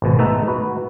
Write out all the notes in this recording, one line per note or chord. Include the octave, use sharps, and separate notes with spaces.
G#1 B2
G#2 A3 B3 D#5 E5 A#5
F#4 B4